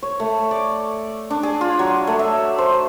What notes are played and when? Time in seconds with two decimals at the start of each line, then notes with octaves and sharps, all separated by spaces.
0.03 C#5
0.20 A3
0.51 D5
1.30 D4
1.43 G#4
1.61 F4
1.79 F#3
2.07 A3
2.19 E5
2.58 C5